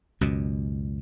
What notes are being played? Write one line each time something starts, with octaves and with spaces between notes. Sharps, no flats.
C#2 F#2 B2